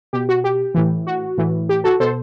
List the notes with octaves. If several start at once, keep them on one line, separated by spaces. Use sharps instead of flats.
B2 G4
F#4
G4
A2 E3
F#4
A2 E3
G4
F#4 A4
B2 A4 C5